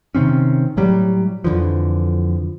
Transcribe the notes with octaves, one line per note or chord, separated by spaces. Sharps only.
C3 D#3 C4 C#4
A2 F#3 G3
F2 D3 E3 F3